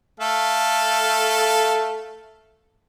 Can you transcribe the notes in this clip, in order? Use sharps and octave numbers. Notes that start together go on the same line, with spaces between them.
A3 A4 F5